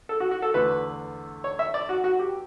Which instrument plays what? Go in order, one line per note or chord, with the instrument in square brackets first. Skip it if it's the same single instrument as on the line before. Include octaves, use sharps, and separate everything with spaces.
[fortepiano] A4
F#4
F#4
A4
E2 D3 A3 B4
C#5
E5
D5
F#4
F#4
G4